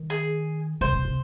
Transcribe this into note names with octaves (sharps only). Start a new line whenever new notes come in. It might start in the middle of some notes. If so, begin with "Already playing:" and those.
Already playing: D#3
G#4
C#3 C5
C3
C3